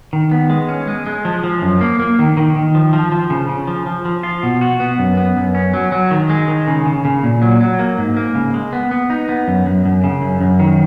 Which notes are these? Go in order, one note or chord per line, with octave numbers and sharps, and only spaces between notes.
D#3
B3
G#3
C#4
G#3
G#3
F3
F3
F#2
A#3
A#3
D#3
D#3
D#3
F3
F3
F3
C#3
C#3
F3
F3
F3
F4
B2
F#4
B3
F#2
B3
F#2
C#4
F#3
F#3
D#3
G#3
D#3
C#3
C#3
C#3
A#2
F#3
F#3
A#3
G#2
A#3
C#3
G#3
B3
B3
D#4
B3
F#2
F#2
F#2
C#3
F#2
F#2
D#3